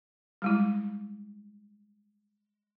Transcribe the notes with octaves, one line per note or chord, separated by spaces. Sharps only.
G3 G#3 E4